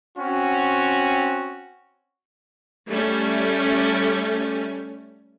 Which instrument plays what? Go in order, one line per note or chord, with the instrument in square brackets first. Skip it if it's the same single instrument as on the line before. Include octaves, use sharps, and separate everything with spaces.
[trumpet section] C4 C#4 F#4
[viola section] G3 A3 C#4